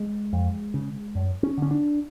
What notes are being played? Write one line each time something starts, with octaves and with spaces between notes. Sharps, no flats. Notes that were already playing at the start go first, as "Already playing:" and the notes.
Already playing: G#3
F2
C#3
F#2
C#4
D3 C#4
D4